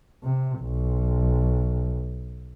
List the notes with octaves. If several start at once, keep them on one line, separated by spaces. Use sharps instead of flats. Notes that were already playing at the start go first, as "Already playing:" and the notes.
C3
B1